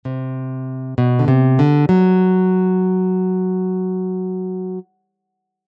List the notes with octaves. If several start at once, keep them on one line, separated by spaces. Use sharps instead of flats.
C3
B2
D3
C3
D3
F#3